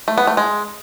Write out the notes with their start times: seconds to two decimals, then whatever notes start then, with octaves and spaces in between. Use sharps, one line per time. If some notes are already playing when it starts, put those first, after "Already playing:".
0.08 A3
0.18 B3
0.27 A3
0.37 G#3